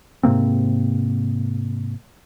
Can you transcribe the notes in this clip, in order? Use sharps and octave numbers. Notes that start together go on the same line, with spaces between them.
G#2 C3 A#3 C4